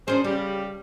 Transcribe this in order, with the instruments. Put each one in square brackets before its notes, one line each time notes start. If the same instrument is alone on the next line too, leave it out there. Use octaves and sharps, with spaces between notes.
[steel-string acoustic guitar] F#3 C#4 D4 [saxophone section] G#4 A#4 C5
[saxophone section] C#3 G3 [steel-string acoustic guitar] G4